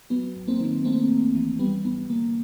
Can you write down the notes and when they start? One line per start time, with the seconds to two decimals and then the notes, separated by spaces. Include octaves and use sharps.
0.10 F#3 B3
0.36 G#1
0.47 A#3 C4
0.60 D#3
0.84 A3 A#3 C4
1.09 A1
1.35 E3
1.59 G3 B3
1.84 G#1 B3
2.09 D3 A#3